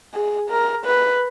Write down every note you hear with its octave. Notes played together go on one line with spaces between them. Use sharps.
G#4
A#4
B4